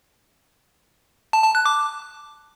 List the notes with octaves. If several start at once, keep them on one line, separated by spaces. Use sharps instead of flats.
A5
A5
F#6
D6